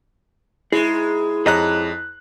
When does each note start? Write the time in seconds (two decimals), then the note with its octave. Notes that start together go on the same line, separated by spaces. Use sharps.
0.72 G#2 G#3 E4 G#4
1.46 F2 G#4 C#5 D#5 A#5 F#6